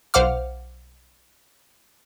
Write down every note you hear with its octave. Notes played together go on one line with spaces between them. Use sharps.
B1 C5 F5 F#5 D6 F6